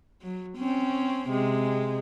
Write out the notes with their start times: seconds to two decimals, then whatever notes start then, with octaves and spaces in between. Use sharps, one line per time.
0.22 F#3
0.57 C4 C#4
1.29 C3 G#3